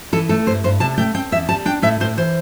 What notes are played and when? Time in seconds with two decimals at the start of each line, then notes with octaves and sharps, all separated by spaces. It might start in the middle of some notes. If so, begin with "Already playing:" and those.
0.12 E3 A4
0.29 A3 A4
0.46 G2 C5
0.64 G2 C5
0.80 C3 A5
0.97 A3 G5
1.15 C4 G5
1.32 E2 E5
1.49 G3 A5
1.65 D4 G5
1.82 A2 E5
2.00 A2 C5
2.17 E3 C5